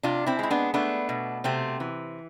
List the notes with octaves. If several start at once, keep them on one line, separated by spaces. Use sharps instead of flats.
C3 D4 F4
C4 E4
G#3 E4
B3 D4
A3 B3 D4
B2
C3 A3 C4
E3